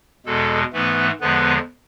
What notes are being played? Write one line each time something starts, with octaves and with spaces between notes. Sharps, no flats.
E2 B2 G#3 A4
G#2 E3 A3 B3 B4
E2 D3 F3 G#3 B3 B4